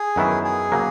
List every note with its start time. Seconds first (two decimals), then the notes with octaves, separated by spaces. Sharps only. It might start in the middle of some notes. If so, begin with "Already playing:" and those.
Already playing: G#4
0.16 F#2 D#3 F#3 B3 E4
0.44 G#4
0.72 C#3 F#3 A#3